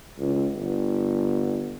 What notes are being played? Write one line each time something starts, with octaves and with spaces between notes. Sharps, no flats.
C#2
G1